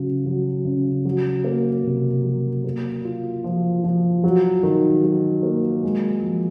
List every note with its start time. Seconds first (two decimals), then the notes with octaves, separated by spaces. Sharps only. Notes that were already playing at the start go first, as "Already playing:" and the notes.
Already playing: C#3 F#3
0.26 F#3
0.65 C#3
1.05 F#3
1.45 A#3
1.84 C3
2.24 F#3
2.65 A#3
3.05 F4
3.44 F3
3.84 F3
4.24 F#3
4.63 D#3
5.04 F#3
5.43 A#3
5.83 G#3
6.23 F3